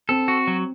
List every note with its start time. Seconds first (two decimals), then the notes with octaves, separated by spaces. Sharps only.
0.09 C4 A4
0.28 F#4
0.47 F#3